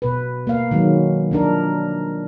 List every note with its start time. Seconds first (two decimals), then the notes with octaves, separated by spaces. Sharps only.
0.02 B2 B4
0.47 A#3 F5
0.71 D#3 F#3 G#3
1.31 F3 D4 A#4